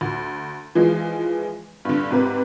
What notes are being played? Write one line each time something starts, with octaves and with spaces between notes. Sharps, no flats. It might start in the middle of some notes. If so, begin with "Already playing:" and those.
D2
E3 F3 G#3
G2 D3
G#2 C3 B4